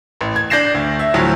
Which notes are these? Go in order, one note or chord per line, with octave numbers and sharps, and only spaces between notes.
A1
G#6
D4 G6 A#6 C7 E7
D2
E5
D2 A2 F3 F#3